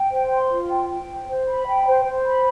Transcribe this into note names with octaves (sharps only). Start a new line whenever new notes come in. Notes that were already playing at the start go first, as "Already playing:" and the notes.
Already playing: G5
C5
C6
F4
G5
G5
C5
C5
B5
G5
C5
C5
B5